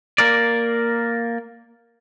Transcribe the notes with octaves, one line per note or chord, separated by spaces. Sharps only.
A#3 A#4 D5